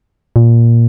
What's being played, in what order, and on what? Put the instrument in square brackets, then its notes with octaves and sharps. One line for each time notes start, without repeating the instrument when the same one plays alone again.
[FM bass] A#2